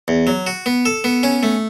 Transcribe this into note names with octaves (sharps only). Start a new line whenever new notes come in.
E2
F#3
F#4
B3
A4
B3
C#4
A3